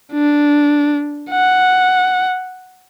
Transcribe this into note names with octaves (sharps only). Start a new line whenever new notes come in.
D4
F#5